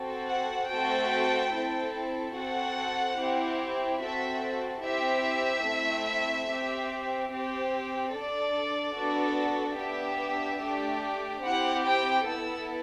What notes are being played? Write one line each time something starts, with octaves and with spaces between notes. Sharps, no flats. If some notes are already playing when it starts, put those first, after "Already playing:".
Already playing: C4 F#4 A4
F#5
A3 C4 F#4 A4 G5
C4 E4 A4
C4 F#4 A4 F#5
C4 E4 G4
C4 F#4 A4 E5
C4 E4 G4 E5
A3 C4 E4
C4 G4
C4 G4
D4 A4 D5
B3 D4 F#4 A4
B3 D4 G4 E5
A3 D4 G4
C4 E4 G4 F#5
G5
B3 E4 A4 E6